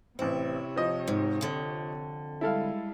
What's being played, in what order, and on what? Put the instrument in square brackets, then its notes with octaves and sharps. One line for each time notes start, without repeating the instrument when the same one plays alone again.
[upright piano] A1 C4 [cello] C3 C#5 [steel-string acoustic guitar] E4
[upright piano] F3 D#5
[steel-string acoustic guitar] G#2
F2 D3
[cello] G3 G#3 [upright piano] E4 A4 F5